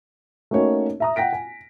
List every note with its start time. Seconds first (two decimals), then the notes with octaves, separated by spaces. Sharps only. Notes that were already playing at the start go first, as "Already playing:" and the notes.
0.51 A3 A#3 C#4 D#4 F#4 C#5
1.00 E5 A#5 D#6
1.16 F#5 G5 A#6 B6 D7
1.33 G#5